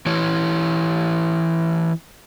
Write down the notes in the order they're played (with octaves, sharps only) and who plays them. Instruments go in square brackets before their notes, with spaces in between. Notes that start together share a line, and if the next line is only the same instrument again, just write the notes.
[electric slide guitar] E3 E4 C#5